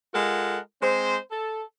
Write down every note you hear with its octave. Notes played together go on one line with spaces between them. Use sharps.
G#3 F4 A4 A#4 F#5
G#3 C4 C5
A4